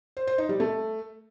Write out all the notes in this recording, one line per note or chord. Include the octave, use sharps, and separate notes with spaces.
C5
C5
D#4
G3
A3